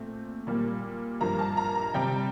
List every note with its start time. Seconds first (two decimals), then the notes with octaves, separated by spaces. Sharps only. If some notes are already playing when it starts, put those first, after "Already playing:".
Already playing: A#2 A3 C4
0.47 A#2 G3 A#3
1.21 G2 F3 A#3 A#5
1.39 A5
1.57 A#5
1.75 A#5
1.94 C3 G3 C4 G5